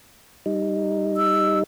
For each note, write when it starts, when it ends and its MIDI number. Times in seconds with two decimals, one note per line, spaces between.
0.46 1.63 55
0.46 1.63 63
1.17 1.59 88